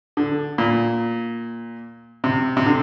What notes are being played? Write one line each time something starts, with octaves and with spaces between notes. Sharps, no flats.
D3
A#2
C3
C3
D3